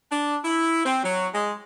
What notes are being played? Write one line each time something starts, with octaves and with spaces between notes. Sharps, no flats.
D4
E4
C4
F#3
G#3